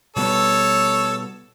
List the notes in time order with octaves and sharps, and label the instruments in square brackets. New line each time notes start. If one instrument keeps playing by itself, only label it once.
[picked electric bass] B2 G3 B3 [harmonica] A4 C#5